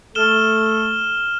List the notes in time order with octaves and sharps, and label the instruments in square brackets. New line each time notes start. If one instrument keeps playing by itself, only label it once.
[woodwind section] A3 A4 [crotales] F6 E7 G7